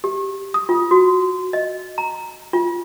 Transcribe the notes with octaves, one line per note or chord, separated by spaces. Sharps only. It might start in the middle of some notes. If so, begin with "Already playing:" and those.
G4
D#6
F4
F#4
D#5
A#5
F4